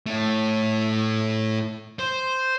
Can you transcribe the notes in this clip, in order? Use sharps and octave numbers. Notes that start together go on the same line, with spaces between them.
A2 A3
C5